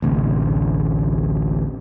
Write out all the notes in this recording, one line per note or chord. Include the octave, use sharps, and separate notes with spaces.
A1 D2 C3